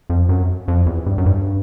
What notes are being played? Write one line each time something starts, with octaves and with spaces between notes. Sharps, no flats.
F2
F#2
F2
E2
G2
F#2
G2